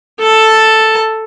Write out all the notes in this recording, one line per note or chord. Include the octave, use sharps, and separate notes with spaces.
A4 A5